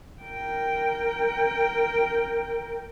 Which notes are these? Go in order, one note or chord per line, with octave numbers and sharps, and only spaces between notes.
A#4 G5